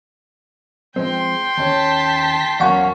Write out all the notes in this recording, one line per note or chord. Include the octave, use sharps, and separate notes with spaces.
F3 G#3 C4 G5 C6
D#2 C#4 C#5 A5 B6
E2 F#3 A#3 C#4 F5 F#5 C#6